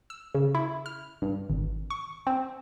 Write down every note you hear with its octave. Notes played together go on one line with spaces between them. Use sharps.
E6
C#3
E4
F6
G2
G#1
C#6
C4